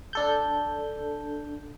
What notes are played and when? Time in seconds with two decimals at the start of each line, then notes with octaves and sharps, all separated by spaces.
0.13 D4 A4 G6